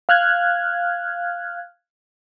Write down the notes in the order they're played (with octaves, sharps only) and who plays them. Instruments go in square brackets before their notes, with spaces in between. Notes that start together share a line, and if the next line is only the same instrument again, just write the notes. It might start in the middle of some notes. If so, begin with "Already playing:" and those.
[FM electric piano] F5 F6 F#6 G#6